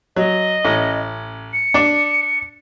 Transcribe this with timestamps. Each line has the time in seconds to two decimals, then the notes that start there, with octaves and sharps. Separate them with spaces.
0.16 F#3 D#5
0.65 A1 C#4
1.53 C#7
1.74 D4 D5